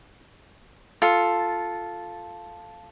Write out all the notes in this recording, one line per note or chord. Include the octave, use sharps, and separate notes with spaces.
F4 A4